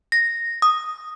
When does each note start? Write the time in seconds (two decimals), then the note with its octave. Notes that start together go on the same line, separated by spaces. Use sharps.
0.12 A#6
0.62 D#6